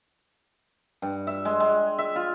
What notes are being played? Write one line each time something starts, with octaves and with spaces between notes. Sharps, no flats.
G2
E5
G#3
G#3
E5
F4